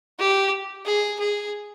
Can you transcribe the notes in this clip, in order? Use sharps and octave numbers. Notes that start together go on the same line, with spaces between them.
G4
G#4
G#4